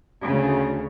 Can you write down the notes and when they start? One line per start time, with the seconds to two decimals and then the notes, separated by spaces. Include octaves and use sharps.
0.25 D2 C#3